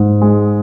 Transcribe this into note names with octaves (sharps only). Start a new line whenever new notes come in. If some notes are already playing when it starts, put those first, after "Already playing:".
Already playing: G#2
G#3